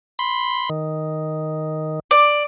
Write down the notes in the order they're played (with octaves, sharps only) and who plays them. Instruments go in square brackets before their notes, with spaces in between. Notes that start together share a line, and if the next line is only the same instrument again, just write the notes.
[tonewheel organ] B5 C6
D#3
[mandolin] D5